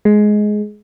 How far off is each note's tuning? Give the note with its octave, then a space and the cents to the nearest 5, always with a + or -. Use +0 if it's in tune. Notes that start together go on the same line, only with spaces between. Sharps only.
G#3 +15